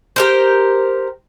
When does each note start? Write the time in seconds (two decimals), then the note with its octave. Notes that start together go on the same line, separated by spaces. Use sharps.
0.16 G4 A#4 C5